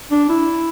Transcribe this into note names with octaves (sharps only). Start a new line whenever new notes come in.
D4
E4